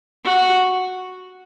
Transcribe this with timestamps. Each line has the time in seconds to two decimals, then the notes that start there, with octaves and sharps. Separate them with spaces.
0.24 F#4